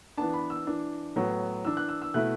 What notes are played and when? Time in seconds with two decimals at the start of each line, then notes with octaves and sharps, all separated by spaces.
0.17 E3 B3 D4 A5
0.34 B5
0.50 E6
0.67 E3 D4
1.16 A2 F#3 B3
1.64 E3 D4 E6
1.77 F#6
1.89 E6
2.02 E6
2.14 B2 A3 E4 F#6